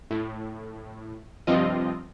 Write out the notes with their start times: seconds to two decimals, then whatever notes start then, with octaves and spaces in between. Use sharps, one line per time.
0.11 A2
1.47 G2 C3 F3 C4 F4 D#5